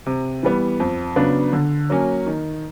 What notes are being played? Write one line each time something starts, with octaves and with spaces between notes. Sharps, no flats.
C3
E3 G3 B3
F2
C#3 F#3 B3 D4
D3
F#3 A#3 C#4
D#3